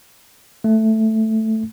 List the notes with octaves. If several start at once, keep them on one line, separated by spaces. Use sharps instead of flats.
A3